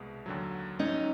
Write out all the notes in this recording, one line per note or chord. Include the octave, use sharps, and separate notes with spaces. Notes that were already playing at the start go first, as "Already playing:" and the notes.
Already playing: C2 B2 G#3 B3
D#2 D3 F#3
C#4 D#4